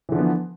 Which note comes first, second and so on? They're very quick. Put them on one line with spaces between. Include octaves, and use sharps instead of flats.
E3 D3 F3 B3